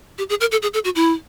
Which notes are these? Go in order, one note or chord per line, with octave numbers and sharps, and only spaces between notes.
G4
G#4
A#4
A4
G#4
A4
F#4
E4